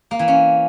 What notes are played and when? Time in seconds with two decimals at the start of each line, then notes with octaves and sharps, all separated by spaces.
0.11 A#3
0.19 E3
0.28 C#4